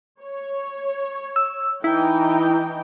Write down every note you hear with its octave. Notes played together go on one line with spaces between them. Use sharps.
C#5
E6
E3 D#4 E4 G5